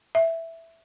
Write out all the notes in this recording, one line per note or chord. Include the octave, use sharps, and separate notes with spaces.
E5